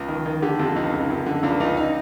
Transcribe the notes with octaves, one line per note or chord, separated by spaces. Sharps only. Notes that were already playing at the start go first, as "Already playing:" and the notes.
Already playing: C#2
D#3
D#3
D3 G4
F2
C#2 D#4
C#3
F#2
D3
C#2 D4
C#2 D#4
D#4